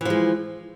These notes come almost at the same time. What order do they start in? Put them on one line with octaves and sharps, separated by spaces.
E3 F3 G#3